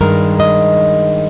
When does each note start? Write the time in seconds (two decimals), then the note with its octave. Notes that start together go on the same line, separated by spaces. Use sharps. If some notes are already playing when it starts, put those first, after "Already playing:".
0.01 G2 D#3 G#3 A#4
0.40 D#5